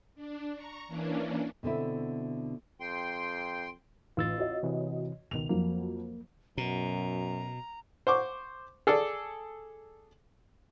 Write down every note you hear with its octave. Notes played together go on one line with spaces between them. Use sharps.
D4
A#5 C#6
E3 A#3 C#4 D4
B2 D3 C4 E4
F2 G5 C6
A1 F4 E6 A6
F#4 C#5 D#5
C3 E3
C#2 B2 D#3 F7
F2 F#3 A#3
F#2 B2 A#5
C5 C#6 D6
G#4 A4 D5